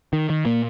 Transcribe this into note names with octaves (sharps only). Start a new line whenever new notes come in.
D#3
D#3
A#2 A#3